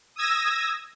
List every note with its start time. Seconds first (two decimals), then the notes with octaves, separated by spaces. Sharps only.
0.16 D#6 E6 G#6 A#6